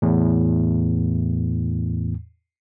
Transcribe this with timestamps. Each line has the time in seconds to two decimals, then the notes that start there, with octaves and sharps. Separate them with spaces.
0.02 E2 A2